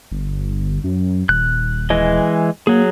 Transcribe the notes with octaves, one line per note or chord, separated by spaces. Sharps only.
G1
F#2
D#1 F#6
E3 G#3 D#5
F#3 A#3 G#4